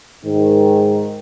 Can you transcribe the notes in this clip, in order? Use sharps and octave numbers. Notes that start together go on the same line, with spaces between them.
G#2 D#3